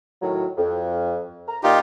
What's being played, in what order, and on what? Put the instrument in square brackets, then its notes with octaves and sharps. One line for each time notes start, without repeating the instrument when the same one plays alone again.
[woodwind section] A2 D#3 F#3
F2
A#5
[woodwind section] A#2 [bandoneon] D#4 F4 G4